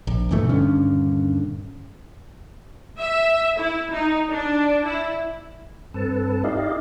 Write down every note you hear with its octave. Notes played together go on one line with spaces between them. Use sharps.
A#1
G2 B2 E3 A3
D#1 G2 D3 C#4
E5
E4
D#4
D4
E4
G2 C4 A4 B4 A5
D#4 E4 G4 D5 D#5 F5